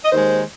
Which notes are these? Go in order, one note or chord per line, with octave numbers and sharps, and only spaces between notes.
D#5
D#2 D#3 G#3 C5